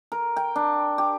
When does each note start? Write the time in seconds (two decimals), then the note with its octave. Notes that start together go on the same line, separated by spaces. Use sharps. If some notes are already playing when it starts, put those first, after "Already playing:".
0.12 A#4
0.36 G5
0.56 D4
0.98 G4